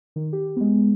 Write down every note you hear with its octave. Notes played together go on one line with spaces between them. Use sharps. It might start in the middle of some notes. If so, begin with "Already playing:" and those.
D#3
G4
G#3 B3